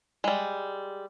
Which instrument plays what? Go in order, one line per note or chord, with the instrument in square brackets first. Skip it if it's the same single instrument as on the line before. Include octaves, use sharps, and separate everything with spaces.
[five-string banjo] G3 G#3